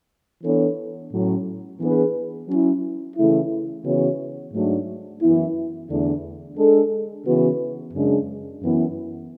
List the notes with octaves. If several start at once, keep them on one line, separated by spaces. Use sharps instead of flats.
E3 B3 D4 A4 C#5
A2 F#3 C#4
E3 B3 D4 G#4 B4
F#3 C#4 E4
C#3 E3 A3 E4
C#3 E3 B3 F#4 C#5
G#2 F#3 A3 D4
F#2 E3 B3 E4
E2 D3 A3 D4
G#3 D4 A4
C#3 E3 B3 F#4 B4
F#2 C#3 G#3 D4
F#2 E3 B3 E4